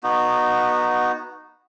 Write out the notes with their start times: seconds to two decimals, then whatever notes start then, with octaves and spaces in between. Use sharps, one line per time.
0.03 B3 D#4 F#4